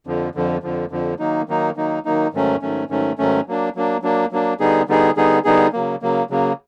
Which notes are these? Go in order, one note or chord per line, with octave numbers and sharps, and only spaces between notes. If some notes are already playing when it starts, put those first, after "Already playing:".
F2 D3 F3
F2 D3 F3
F2 D3 F3
F2 D3 F3
D#3 F#3 A#3 D#4
D#3 F#3 A#3 D#4
D#3 F#3 A#3 D#4
D#3 F#3 A#3 D#4
G#2 D#3 F#3 A3 C#4
G#2 D#3 F#3 A3 C#4
G#2 D#3 F#3 A3 C#4
G#2 D#3 F#3 A3 C#4
F#3 A#3 D4
F#3 A#3 D4
F#3 A#3 D4
F#3 A#3 D4
D3 G3 B3 D#4 G#4
D3 G3 B3 D#4 G#4
D3 G3 B3 D#4 G#4
D3 G3 B3 D#4 G#4
C#3 F#3 A#3
C#3 F#3 A#3
C#3 F#3 A#3